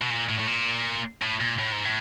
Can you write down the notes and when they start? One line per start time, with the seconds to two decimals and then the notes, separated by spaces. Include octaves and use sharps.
0.01 B2
0.10 A#2
0.29 A2
0.39 A2
0.47 A#2
1.22 A2
1.40 A#2
1.59 A2
1.72 G#2
1.85 A2